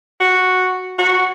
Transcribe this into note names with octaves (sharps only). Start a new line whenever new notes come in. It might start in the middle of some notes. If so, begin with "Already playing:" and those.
F#4
F#4